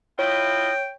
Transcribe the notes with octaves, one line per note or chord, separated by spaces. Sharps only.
E4 F4 C#5 D#5 G5